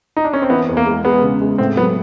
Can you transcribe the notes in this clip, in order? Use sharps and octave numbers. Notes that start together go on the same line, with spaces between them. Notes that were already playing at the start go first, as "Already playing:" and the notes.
D#4
D4
C#4
C4
E3 B3
E2
A#3
G#3
G#3 B3
C#3
G#3
A2 C4
F#3 B3